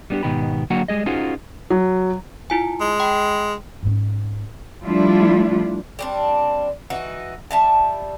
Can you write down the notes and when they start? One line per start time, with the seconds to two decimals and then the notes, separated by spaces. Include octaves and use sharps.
0.10 G3 B3 D4 F#4 G4
0.23 G#2 B2 D#3 B3 G4 B5
0.70 D3 F#3 A#3 F#4 F#5
0.88 G3 G#3 G#4 D#5
1.06 C#4 D#4 F4 F#4 G#4 C5
1.70 F#3
2.50 E4 F4 G#5
2.81 G#3
3.00 G5 B5
3.83 G#2 C#4
4.84 F3 G3 A3 D4 E4 F4
5.99 G3 C4 D4
6.90 E3 D#4 F#4
7.51 G3 E5 A5